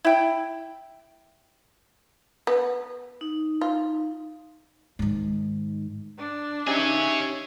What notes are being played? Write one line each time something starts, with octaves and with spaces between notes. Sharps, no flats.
E4 G5
B3
D#4
F4
G#2 D#3
D4
C#4 D#4 G4 G#4 C#5 E5 G#5